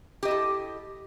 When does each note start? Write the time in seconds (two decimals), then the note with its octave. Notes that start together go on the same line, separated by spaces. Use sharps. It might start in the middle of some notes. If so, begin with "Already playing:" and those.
0.23 G4
0.25 D#5
0.28 E4
0.31 A4